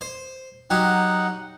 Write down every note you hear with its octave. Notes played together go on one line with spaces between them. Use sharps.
C5
F#3 D#4 G4 F#5